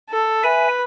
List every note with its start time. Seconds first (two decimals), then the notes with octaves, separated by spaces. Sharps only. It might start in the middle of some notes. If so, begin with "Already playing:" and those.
0.10 A4
0.43 B4 E5 G#5